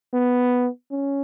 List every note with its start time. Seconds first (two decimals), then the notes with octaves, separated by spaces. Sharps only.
0.14 B3
0.92 C#4